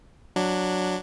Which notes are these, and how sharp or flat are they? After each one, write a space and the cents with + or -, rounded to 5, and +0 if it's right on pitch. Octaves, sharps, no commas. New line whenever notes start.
F#3 -5 D4 +0